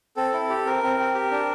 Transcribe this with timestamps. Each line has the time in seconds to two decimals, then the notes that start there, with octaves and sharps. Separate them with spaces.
0.17 C4 A4
0.33 E4
0.50 G4
0.66 C4 A#4
0.83 C4
0.99 C4
1.15 G4
1.31 D4